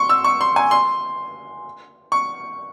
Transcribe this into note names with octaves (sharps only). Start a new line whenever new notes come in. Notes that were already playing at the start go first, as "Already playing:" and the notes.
Already playing: C6 C#6
E6
C#6
C6
G#5
C6
C#6